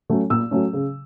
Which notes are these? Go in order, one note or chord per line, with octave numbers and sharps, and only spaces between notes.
F#3 A3 C#4
A#2 E6
F#3 A3 C#4
C#3